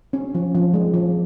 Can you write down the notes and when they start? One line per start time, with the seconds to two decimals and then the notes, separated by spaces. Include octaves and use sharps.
0.13 C#4
0.35 F3
0.55 F3
0.74 G#3
0.94 F3